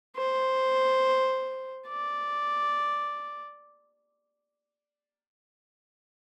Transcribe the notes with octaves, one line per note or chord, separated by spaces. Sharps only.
C5
D5